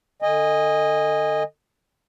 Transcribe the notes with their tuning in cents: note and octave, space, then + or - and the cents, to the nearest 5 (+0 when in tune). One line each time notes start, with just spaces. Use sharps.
D3 +25 D#5 +0 G#5 -25